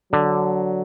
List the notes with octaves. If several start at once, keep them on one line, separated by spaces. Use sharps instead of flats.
D3 F#3